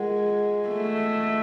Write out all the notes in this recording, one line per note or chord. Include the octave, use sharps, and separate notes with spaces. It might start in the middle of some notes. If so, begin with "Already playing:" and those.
Already playing: G#3 F4 A#4 D#5 F#5
A3